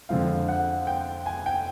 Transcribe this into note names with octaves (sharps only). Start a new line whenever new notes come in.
F2 D3 F3 G#3 F5
F#5
G5
G#5
G5